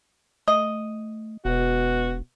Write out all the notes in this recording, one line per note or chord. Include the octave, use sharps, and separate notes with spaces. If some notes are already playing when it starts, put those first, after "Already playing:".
A3 D#5
E1 B2 F#4